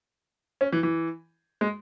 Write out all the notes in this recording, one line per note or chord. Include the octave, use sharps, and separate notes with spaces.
C#4
E3
E3
G#3